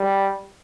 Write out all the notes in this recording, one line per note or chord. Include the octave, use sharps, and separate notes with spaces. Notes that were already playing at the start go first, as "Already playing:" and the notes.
Already playing: G3